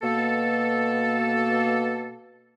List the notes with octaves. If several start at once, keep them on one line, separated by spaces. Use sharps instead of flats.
B2 A#3 A4